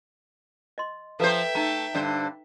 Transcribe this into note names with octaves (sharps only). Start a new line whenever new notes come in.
D#5 C6
F3 A4 B4 C5 E5 G5 A#5
A3 D#4 A#5
G2 D3 C5